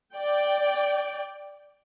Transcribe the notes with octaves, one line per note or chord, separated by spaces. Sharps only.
D5 G5